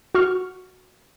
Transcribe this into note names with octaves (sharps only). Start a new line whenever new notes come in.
F#4 C#6 F6